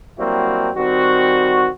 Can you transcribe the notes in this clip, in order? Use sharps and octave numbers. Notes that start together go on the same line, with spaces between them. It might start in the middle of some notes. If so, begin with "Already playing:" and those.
F#3 G3 A#3 C4 E4 F#4
D#3 G3 C4 F#4